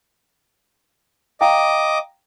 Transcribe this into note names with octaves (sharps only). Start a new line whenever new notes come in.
D#5 F5 G5 A#5 D6